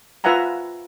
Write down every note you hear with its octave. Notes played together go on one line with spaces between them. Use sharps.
F4 B4 E5 F#5 G#5 A#5